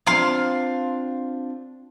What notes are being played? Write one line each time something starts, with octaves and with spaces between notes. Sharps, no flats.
C4 D4 F4 F5 C6